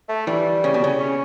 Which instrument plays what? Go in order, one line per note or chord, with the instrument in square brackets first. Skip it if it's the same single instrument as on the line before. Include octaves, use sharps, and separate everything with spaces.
[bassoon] A3
[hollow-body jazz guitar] E3 [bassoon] G3
[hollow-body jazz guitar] C#3
B2
C#3
[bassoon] C#4